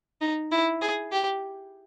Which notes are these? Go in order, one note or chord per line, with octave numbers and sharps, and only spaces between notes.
D#4
E4
G#4
G4